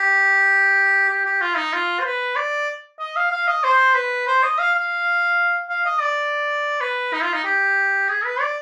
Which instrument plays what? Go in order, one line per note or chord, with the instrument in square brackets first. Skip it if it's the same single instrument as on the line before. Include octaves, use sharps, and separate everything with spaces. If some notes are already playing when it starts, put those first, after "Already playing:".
Already playing: [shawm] G4
G4
G4
F4
D#4
F4
C5
B4
D5
D#5
F5
F5
D#5
C5
B4
C5
D#5
F5
F5
F5
D#5
D5
B4
D#4
F4
D#4
G4
G#4
B4
D5